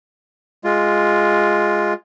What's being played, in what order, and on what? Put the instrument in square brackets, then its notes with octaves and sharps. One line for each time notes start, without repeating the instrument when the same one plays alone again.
[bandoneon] G#3 F4